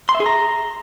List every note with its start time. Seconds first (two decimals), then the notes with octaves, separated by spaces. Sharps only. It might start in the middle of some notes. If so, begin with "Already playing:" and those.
0.09 C6
0.15 E5
0.20 G#4
0.26 A#5